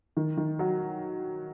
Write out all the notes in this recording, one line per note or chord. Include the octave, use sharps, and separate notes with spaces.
D#3
D#3
F#3